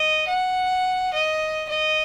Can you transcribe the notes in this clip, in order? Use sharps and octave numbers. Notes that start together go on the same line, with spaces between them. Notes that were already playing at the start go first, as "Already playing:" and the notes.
Already playing: D#5
F#5
D#5
D#5